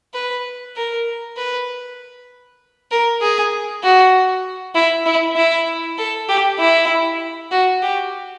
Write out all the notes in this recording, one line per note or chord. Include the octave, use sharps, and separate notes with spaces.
B4
A#4
B4
A#4
G#4
F#4
E4
E4
E4
A4
G4
E4
F#4
G4